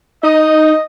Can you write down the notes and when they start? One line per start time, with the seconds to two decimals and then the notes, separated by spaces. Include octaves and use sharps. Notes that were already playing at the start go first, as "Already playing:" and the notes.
0.23 D#4 D#5